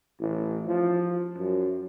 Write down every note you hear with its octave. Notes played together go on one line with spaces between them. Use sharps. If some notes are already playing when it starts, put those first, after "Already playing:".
A1
F3
F#2